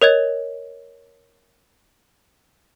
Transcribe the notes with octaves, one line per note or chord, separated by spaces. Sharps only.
A#4 C#5 D#5 G#6